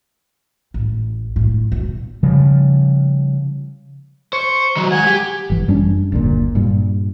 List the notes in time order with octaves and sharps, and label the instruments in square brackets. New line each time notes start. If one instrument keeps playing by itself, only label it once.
[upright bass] A1
A2
B2
[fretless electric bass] C#3 F3 G3
[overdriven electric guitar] C5 [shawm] C#6
[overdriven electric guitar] D#3 F#3
[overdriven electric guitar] G#3 F#5 [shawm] G#5
[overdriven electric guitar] G4
[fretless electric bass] G1 E3
F#2 G3 C#4 D4
F#1 D2 A#2
G2 A#2 G3